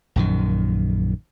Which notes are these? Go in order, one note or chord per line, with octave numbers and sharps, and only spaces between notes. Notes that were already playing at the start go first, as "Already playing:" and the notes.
A#1 F#2 D#3